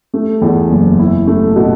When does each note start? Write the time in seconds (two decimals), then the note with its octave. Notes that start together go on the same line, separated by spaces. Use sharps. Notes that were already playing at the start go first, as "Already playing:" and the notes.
0.14 A3
0.42 E2
0.70 F#1
0.99 E4
1.27 A3
1.56 B2